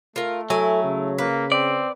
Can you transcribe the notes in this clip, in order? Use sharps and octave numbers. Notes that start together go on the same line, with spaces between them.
A3 F4 A#4
F#3 E4 A4 G#5
C#3
A#3 B4
C4 D5